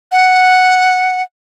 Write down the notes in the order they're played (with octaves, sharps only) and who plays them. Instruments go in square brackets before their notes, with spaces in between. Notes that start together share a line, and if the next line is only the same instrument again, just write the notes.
[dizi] F#5